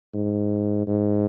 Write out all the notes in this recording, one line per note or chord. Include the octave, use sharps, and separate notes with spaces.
G#2
G#2